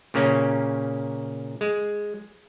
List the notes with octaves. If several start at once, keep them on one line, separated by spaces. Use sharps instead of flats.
A#2 C#3 A#3 C#4
G#3